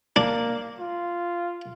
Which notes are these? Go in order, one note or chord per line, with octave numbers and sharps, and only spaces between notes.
A#3 D4
F4